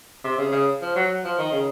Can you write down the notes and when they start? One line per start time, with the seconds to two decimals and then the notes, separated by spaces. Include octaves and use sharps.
0.24 C3
0.38 C#3
0.52 C#3
0.82 F3
0.96 F#3
1.24 F3
1.38 D#3
1.52 C#3